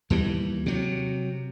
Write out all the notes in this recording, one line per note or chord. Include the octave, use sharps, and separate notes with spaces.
D#2 E3 G3
C3 F#3